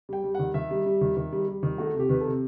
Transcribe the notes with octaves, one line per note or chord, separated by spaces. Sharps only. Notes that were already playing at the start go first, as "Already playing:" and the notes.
G3 G5
G3
D#3 F#5
D#3 E5
G3
G3
D#3
D#3
G3
G3
D#3
A3 F#4
C3 G4
D#3 B4
C3 A4